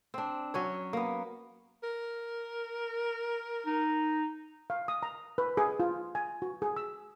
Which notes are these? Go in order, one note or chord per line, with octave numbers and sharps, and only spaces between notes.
C4 D4
F#3 C#4 C#5
A#3 B3
A#4
D#4
F5
D#6
A#5
B4
G#4
F4
G#5
F#4
G#4
E6